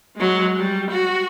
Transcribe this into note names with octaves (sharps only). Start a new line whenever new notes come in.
F#3 G#3
G3
F#4